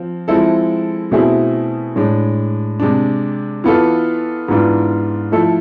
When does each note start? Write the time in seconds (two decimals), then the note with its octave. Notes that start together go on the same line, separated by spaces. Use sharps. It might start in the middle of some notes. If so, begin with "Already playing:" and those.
Already playing: F3 C4
0.28 F3 G#3 C4 E4 A4
1.11 B2 A3 C4 E4 G#4
1.96 A2 G#3 D4
2.80 C3 G#3 D4
3.64 E3 B3 F4 A4
4.48 G#2 E3 B3 D4 F4
5.32 F3 A3 E4 A4